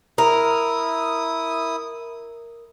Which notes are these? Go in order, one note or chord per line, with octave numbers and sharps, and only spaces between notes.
E4 A#4 D#6